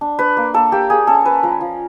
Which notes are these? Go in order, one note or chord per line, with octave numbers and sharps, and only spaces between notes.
D4
D4 B4
A#3
A#3 A4
A#3 G4
A#3 G#4
C#4 A4
C#4 B4
F3 A#4
F3